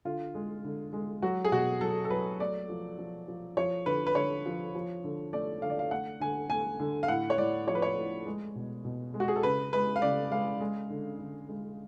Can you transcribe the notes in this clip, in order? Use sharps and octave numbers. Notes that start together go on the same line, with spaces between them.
D3 F4
G#3
D3
G#3
F#3 F#4
G#4
B2 F#4
F#3 A4
A4
F#3 B4
A3 D5
F3
F3
F3
F3 C#5
D3 B4
B4
D3 C#5
F3
F3
D3
A3 D5
D3 F5
D5
F5
A3 F#5
D3 G#5
A3 G#5
D3
F5
A2 F#5
C#5
A2 D5
F3 C#5
B4
C#5
A2
G#3
B2
B2
G#3
F#4
G#4
A4
C#3 B4
G#3 B4
F5
C#3 D5
G#3 F5
G#3
D3
D3
G#3